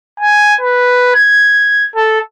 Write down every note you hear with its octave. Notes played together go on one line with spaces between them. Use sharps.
G#5
B4
G#6
A4